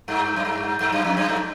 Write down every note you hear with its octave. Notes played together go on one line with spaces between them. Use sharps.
G2
F#2
G2
G2
F#2
F2
F#2
G2